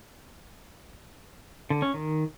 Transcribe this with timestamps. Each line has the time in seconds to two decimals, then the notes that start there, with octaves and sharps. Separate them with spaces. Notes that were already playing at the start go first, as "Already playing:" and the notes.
1.70 D3
1.82 C#4
1.94 D#3